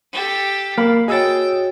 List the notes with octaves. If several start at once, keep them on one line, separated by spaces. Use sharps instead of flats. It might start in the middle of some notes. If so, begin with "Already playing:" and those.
G4 A4
A#3 A#4 F5 B5
F#4 G#4 C#5 D#5 G5 E6 A6